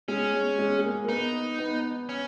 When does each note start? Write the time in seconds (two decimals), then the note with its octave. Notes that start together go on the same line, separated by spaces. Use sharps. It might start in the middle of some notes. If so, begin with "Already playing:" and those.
0.08 G#3 C#4
0.34 G#3
0.59 G#3
0.79 G#3
0.84 A#3
1.05 A#3
1.09 B3 D#4
1.59 B3
2.09 C#4